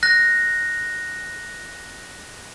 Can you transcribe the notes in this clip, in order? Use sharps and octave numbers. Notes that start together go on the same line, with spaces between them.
F#6 A#6